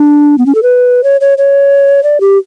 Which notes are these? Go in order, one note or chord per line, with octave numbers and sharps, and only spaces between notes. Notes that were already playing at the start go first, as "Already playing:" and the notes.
Already playing: D4
B3
C#4
A4
B4
C#5
C#5
C#5
D5
G4